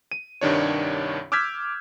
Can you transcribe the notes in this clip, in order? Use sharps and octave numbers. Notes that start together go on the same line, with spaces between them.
D#7
C2 G2 D#3 D4 C#5
D6 E6 F6 G6 G#6 B6